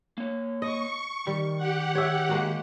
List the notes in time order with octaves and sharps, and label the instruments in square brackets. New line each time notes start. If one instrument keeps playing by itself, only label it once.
[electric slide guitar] A#3 C#5
[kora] D#5 [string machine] C#6
[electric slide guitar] D#3 [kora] G3
[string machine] G4 F#5
[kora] C#5 E5
G#3 A#3 F#4